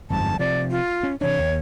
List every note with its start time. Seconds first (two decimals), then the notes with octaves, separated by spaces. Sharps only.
0.10 G1 F2 G#2 A5
0.39 C3 F3 D5
0.71 F4
1.03 C#4
1.21 C3 E3 D4 C#5
1.39 D#2